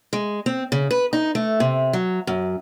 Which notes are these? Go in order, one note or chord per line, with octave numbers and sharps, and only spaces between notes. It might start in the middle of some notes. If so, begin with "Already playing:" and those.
G#3
C4
C#3
B4
D#4
A3
C3
F#3
F#2